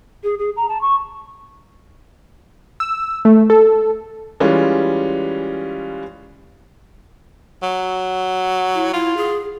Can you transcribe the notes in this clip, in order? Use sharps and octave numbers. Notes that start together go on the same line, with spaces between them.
G#4
G#4
A#5
A5
C#6
E6
A3
A4
E3 G3 G#3 C#4 F4
F#3
E4
E4 F4
G#4